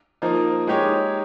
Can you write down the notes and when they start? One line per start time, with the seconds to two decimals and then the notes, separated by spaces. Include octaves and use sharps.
0.22 F3 A#3 D#4
0.67 G#3 D#4 G4 C#5